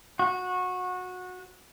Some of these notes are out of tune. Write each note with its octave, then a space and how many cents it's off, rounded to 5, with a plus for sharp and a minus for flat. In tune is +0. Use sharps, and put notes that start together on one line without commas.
F#4 -20